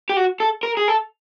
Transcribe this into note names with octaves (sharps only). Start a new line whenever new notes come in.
G4
F#4
A4
A#4
G#4
A4